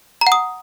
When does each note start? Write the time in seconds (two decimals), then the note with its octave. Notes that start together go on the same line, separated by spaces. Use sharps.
0.21 A#5
0.27 F#5
0.32 D#6